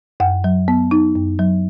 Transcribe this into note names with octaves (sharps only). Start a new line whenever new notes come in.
F#2 F#5
F#3
B3
D#4
F#2
F#3